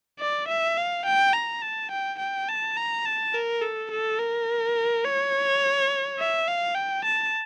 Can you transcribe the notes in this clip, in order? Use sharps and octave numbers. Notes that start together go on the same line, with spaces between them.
D5
E5
F5
G5
A#5
A5
G5
G5
A5
A#5
A5
A#4
A4
A4
A#4
C#5
E5
F5
G5
A5